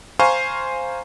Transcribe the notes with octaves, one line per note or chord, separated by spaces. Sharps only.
C5 F5 G#5 A#5 C6 C#6